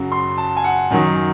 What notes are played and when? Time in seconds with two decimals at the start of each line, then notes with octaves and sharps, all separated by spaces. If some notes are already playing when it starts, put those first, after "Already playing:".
Already playing: F#2 C#3 F#3
0.12 C6
0.38 A5
0.57 G#5
0.64 F#5
0.91 F#2 D#3 F#3